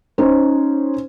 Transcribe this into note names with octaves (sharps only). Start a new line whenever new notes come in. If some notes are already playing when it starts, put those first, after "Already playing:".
C#4 D#4 C5